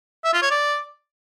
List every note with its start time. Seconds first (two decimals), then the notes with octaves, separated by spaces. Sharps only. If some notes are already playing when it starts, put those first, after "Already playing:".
0.24 E5
0.33 F4
0.42 C#5
0.51 D5